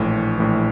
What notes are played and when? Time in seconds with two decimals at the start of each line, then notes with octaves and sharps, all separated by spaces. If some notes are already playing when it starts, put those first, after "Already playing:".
Already playing: A#1 A2 E3
0.38 A#1 A2 E3